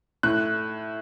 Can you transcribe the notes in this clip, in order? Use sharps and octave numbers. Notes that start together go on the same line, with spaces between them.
A2 F#6